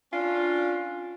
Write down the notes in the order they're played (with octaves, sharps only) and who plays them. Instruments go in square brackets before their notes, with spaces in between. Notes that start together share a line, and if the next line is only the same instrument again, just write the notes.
[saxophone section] C#4 D4 F4